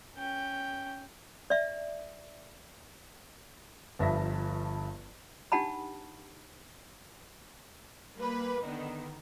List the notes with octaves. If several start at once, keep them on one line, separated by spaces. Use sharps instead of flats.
C#4 G5
D5 E5
G1 G2 F3 E5 A#6
D4 D#4 G4 F#5 A5 B5
G3 A#3 B4
D3 D#3 B3 D#4